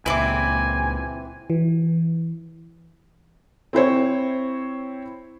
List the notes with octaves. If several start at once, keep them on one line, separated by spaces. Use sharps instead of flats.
C#2 A#2 E3 C4 E4 G#5 D6
E3
C4 E4 C5 C#5